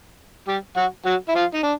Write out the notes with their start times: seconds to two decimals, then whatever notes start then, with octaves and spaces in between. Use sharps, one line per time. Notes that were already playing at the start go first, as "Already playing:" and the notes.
0.48 G3 G4
0.76 F#3 F#4
1.05 F#3 F#4
1.28 E4
1.35 F3 F4
1.54 D#4
1.63 D4